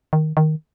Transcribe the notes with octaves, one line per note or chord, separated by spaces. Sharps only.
D#3
D#3